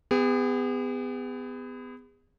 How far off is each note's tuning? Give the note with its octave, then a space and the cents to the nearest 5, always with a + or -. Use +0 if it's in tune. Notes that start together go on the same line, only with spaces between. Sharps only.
B3 +25 G#4 -40